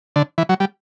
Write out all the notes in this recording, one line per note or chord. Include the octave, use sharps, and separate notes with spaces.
D3
E3
F#3
G3